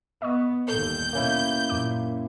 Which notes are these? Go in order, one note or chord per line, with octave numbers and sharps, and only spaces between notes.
B3 D#5 C#6 D#6
G1 D#2 A4 G6
B2 A#3 C#4 E4
F#2 A#2 D6